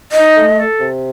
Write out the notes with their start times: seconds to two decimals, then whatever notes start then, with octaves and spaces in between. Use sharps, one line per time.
0.12 D#4 D#5
0.37 A3
0.59 A4
0.80 C3